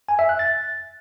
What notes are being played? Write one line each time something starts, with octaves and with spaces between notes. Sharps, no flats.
G#5
E5
F#6
A6